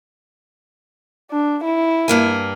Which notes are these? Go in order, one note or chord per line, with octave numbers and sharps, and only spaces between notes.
D4
E4
G2 A#3 G#5